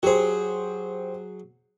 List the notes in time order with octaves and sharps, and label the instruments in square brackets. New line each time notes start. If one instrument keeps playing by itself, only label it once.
[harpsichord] F#3 G#4 [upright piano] G4 C5